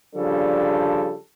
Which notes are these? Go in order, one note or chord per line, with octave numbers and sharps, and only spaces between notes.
C#3 F3 G3 D4 A4